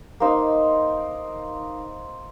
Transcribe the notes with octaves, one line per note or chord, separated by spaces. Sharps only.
A#3 D#4 C5